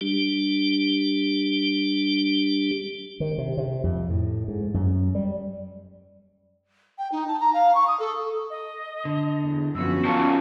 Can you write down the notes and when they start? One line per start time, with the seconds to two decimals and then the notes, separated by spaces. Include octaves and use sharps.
0.01 G3 D4 G4
3.20 D#3
3.38 C3
3.57 C3
3.84 F2
4.10 A2
4.48 G#2
4.74 F#2
5.15 G3
6.98 G5
7.12 D#4
7.28 A5
7.40 A#5
7.54 F5
7.75 C#6
7.87 D#6
8.00 A4
8.50 D#5
9.05 D3
9.44 E2
9.75 F#2 D3 F3 B3 C#4 F#4 E6
10.05 C#3 F3 C4 F5 A5 C#6